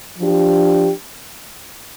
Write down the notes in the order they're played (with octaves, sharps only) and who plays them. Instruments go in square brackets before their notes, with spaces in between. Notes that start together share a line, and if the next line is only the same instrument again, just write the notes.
[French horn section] F3 D4 G4